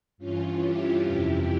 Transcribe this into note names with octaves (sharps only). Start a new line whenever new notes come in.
G2 E3 C#4 F4
E4 G4
F2 C3 E3